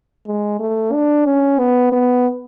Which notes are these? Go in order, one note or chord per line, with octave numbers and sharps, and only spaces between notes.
G#3
A3
D4
C#4
B3
B3